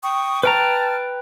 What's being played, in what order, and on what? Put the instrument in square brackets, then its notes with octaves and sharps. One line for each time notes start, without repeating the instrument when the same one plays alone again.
[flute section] G5 C#6 D#6
[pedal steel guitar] B4 G5 A#5 [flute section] A5 F6